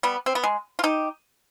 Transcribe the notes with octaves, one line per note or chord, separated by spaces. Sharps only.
G3 B3
C4
B3
G#3
F4
D#4 G4